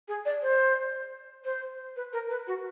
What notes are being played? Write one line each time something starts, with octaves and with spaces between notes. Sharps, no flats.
G#4
D5
C5
C5
B4
A#4
B4
F#4